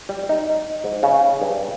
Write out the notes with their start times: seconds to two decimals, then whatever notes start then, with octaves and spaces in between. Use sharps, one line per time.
0.09 G3
0.29 D#4
0.84 G#2
1.03 C#3
1.42 G2